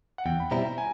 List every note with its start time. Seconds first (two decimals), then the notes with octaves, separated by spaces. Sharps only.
0.18 F#5
0.26 E2 G5
0.40 B5
0.51 B2 G3 C4 E4 A#5
0.78 G#5